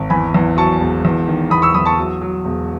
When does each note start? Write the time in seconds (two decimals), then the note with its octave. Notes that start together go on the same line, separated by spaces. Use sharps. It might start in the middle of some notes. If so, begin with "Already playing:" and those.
Already playing: G#1
0.10 E2 G#5 B5
0.34 E2
0.57 F#3 A5 C#6
0.80 E1
1.05 E2
1.28 D#3
1.50 E2 B5 D#6
1.62 C#6 E6
1.74 E2 B5 D#6
1.85 A5 C#6
1.98 F#3
2.22 F#3
2.45 E1